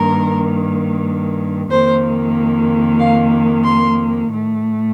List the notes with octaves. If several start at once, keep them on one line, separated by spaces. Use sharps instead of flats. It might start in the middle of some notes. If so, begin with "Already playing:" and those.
Already playing: G2 D#3 A#3 A#4
F2 D#3 A#3 C5
F5
C6
A2 A3